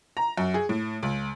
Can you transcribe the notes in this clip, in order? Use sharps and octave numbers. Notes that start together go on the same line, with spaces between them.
A#5
F#2
G#4
A2
C#2